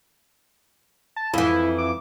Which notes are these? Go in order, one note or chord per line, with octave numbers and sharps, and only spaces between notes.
A5
F2 E3 E4
D6